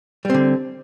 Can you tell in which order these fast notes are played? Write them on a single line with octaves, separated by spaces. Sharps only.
G3 C4 D3